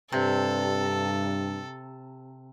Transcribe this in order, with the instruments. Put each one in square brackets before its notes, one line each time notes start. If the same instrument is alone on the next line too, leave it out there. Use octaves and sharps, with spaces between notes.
[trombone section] G2 [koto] C3 [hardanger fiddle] A4